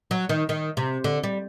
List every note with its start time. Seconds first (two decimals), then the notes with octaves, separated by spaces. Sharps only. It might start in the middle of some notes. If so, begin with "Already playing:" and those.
0.11 F#3
0.29 D#3
0.49 D#3
0.77 C3
1.04 D3
1.23 G3